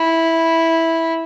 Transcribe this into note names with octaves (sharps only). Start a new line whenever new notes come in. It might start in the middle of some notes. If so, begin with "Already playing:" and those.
Already playing: E4